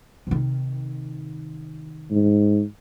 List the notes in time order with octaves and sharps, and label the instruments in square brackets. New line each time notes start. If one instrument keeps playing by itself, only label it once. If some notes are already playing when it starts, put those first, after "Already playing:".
[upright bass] C3 D#3
[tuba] G#2